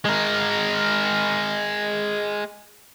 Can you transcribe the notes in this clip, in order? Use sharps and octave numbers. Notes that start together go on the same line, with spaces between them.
G#3 A#4